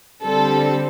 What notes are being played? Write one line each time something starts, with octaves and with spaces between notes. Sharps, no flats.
D3 G3 C4 A4